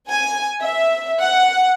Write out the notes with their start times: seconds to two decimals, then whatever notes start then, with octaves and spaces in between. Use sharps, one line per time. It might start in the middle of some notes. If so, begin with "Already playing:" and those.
0.10 G#5
0.63 E5
1.22 F#5